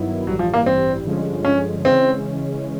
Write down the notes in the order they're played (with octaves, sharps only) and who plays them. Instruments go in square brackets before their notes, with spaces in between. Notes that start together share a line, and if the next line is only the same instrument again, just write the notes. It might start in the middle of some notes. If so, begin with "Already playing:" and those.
Already playing: [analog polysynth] G2 D#3 F#3 B3 E4
[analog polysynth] A1 G2 E3 G3 [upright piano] F#3
[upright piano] F3
A#3
C4
[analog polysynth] G2 D3 F3 G#3 C#4
[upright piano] C#4
[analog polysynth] C#3 E3 G#3 C#4 [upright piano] C4